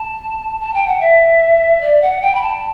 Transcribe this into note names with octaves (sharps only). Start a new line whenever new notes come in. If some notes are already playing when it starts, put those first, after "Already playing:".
Already playing: A5
A5
G5
F#5
E5
D5
F#5
G5
B5
A5